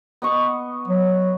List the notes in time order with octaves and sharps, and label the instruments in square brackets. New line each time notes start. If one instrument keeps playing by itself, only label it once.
[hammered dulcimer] B3 D#5 C#6
[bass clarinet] F#3